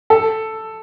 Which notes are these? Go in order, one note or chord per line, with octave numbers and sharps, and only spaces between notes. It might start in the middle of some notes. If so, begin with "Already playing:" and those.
A4